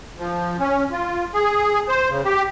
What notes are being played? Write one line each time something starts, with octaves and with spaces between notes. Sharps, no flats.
F3
C#4
F4
G#4
C5
C#3
G4